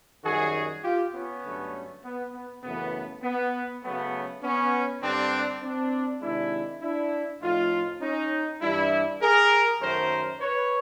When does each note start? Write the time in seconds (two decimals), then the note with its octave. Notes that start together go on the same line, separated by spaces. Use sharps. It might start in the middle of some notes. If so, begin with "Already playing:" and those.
0.24 F#2 D#3 G3 F#4 G#4
0.83 F4 G4
1.13 B3 C#4
1.43 G2 D3 F#3 A3
2.03 B3
2.33 B3
2.63 F#2 C#3 E3 A3 B3
3.23 B3
3.82 C#3 F#3 A3 B3
4.42 B3 C#4
5.02 G2 D3 G3 C4 D4
5.62 C4 D4
6.21 C3 D#3 G#3 D4 E4
6.81 D4 E4
7.41 A2 F3 A3 D#4 F4
8.01 C#4 D#4
8.61 G2 E3 G3 D4 E4
9.21 G#4 A#4
9.80 F#2 D#3 F#3 A3 A#4 C5
10.40 B4 C#5